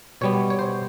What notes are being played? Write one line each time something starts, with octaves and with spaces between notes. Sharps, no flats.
B2 G3 B3 C#5
C#5
C5